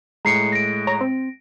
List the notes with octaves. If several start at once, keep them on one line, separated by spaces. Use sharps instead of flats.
A2 G#3 A#5 C7 C#7
A#6 D7
C#5 A#5
C4